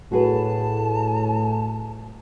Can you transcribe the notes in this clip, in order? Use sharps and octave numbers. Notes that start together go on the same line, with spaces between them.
A2 F#4 G#4 B4 A5